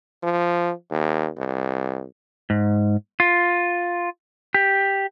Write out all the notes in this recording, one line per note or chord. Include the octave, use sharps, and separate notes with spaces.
F3
D#2
C2
G#2
F4
G4